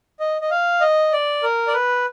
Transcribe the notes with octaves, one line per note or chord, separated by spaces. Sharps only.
D#5
D#5
F5
D#5
D5
A#4
D5
B4